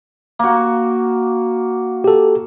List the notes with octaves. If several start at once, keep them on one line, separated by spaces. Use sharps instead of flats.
A#3 F#4
G4 A4